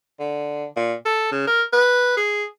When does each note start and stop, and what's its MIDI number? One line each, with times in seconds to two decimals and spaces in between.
0.20 0.66 50
0.76 0.94 46
1.06 1.29 69
1.31 1.47 49
1.47 1.63 70
1.73 2.15 71
2.17 2.44 68